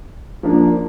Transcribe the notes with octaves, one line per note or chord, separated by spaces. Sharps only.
F3 A#3 D4